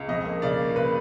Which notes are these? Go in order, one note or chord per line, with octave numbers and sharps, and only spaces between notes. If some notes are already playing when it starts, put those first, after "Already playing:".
Already playing: C#2
F2 D#5
A#3
C#3 D5
A#3
C#3 B4